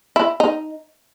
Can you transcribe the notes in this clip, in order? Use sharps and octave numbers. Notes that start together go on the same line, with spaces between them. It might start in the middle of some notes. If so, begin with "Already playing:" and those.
E4
D#4